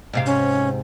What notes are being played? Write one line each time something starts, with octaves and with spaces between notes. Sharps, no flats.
G#2 C3 F5
C#4